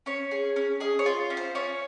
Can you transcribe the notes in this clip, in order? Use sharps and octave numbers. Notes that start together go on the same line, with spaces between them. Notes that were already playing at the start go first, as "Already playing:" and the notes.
C#4 C#5
G#4
C#4
G#4 D#5
C#5
F4
C#4
C5
C#4 C#5